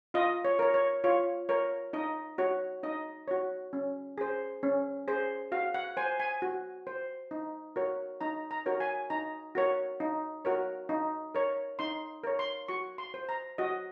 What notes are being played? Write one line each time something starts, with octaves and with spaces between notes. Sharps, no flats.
F4 D#5
C#5
A#4 C#5
C#5
F4 C#5
A#4 C#5
D#4 D#5
F#4 C#5
D#4 D#5
F#4 C#5
C#4
G#4 C5
C#4
G#4 C5
F#4 F5
F#5
C5 G#5
G#5
F#4
C5
D#4
F#4 A#4 C#5
D#4 A#5
A#5
F#4 A#4 C#5
G#5
D#4 A#5
F#4 A#4 C#5
D#4
F#4 A#4 C#5
D#4
A#4 C#5
D#4 C6
A#4 C#5
C6
F#4 C#6
C6
C5
A#5
F#4 D#5